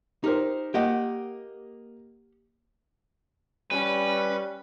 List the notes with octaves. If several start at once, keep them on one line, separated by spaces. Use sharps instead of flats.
D#4 G4 A#4 C5
A#3 G4 D#5 F#5
G3 C#4 B4